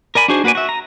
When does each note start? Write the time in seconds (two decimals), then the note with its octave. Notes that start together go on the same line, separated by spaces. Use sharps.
0.15 A#4 D5 G#5 B5
0.28 D4 D#4 F#4 G#4 C5
0.44 A#3 F#4 B4 D5 G#5
0.55 F#4 E5
0.69 A#5